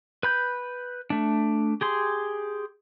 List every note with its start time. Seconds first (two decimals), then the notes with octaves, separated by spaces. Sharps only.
0.23 B4 B5 G6
1.10 A3 D4
1.81 G4 G#4 C6